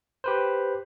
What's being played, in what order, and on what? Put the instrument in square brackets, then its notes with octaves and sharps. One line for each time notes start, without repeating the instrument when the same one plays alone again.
[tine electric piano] G4 B4 C5